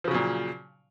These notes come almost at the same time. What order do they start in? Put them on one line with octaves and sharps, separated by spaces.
F3 C#3 F#3 A#2